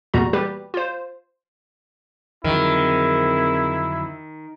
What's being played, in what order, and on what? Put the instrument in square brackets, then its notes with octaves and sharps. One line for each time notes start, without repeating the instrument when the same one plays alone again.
[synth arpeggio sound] E2 A#2 G3 F#4 A#5
G3 G4 B4
F4 C5
[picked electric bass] F2 D3 F#3 [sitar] D#3 [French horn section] C4 G#4 A#4 [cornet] E4